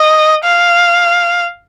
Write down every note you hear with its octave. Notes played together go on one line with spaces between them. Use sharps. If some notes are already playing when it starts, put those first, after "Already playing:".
Already playing: D#5
F5